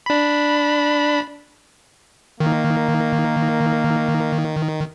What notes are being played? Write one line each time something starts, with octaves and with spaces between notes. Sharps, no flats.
D4 B5
D#3 A#3